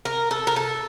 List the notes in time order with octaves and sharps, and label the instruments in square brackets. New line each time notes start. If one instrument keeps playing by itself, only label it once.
[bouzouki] A#4
A4
A#4
A4